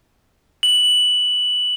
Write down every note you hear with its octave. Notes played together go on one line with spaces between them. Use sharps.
F#7